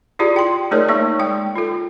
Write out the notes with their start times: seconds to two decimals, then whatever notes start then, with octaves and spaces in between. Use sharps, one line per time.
0.19 E4 F4 G4 G#4 D5
0.36 G5 C6
0.71 A3 D#4 G#4 A#4 C#5 D5
0.88 A#3 D#4 C#6
1.19 G#3 G5
1.56 F4 A4